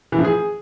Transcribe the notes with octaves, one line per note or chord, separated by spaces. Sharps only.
E3
F3
G#4